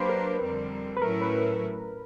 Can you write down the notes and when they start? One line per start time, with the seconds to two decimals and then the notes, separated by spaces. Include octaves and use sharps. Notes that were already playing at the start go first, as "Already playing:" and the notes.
Already playing: F#3 A#3 D4 G4 B4 C5
0.09 A#4
0.40 F2 D3 G3 C4
0.97 B4
1.01 A2 F#3 A3 C#4 E4 A#4
1.22 B4